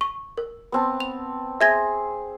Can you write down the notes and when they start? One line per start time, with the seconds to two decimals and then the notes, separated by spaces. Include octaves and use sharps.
0.01 C#6
0.38 A#4
0.72 B3 C4 A5
1.00 F7
1.61 G#4 C5 E5 G#6 A#6